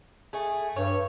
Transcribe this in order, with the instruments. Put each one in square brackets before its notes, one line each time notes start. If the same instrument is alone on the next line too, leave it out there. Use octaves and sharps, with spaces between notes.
[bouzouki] A3 G#4
[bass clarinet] G2 [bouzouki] C#5